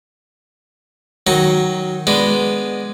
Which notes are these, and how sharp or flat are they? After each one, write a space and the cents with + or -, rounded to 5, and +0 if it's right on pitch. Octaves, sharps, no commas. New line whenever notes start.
D#3 +0 F#3 +0 C#6 -20
G#3 +0 B3 +0 D4 +0